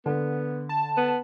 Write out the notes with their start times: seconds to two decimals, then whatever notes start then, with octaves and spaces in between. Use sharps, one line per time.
0.06 D3 B3
0.69 A5
0.97 B3